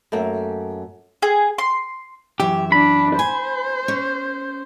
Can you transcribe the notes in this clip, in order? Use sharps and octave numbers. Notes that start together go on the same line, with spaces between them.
F#2 A3 A#3
G#4
C6
F#2 E3 G4 E5
D4 B5
C5 G#5
C#4